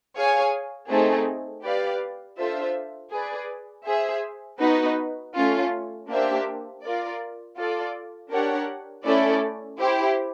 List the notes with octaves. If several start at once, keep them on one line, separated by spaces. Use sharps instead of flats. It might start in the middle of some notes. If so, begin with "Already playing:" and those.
G#4 C#5 F5 G#5
A3 C4 D#4 G#4
G4 B4 D5 F5
D4 F4 A4 C5 E5
G#4 B4 D5
G#4 C5 E5
B3 D#4 F#4 B4
A3 C#4 F4
A#3 D4 G4 C5 E5
F4 A#4 D5
F4 A4 D5
D4 G4 A#4 C#5 F#5
A3 C#4 E4 A4 D5
E4 G4 C5